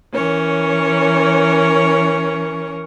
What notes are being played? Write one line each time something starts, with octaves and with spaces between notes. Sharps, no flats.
E3 C#4 A#4 C#5